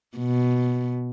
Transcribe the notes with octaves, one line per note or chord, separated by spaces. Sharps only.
B2